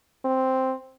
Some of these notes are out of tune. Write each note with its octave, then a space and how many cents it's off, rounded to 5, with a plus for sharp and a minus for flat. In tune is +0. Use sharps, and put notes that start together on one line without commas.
C4 +0